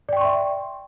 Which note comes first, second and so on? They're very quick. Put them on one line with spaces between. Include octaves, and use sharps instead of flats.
D5 G5 C#6 C6 E5